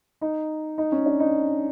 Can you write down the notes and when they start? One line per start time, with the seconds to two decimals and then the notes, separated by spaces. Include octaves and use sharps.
0.21 D#4
0.78 D#4
0.92 C#4
1.06 D4
1.20 D#4